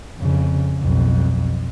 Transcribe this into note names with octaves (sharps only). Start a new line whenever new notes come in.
F2 C#3
B1 F2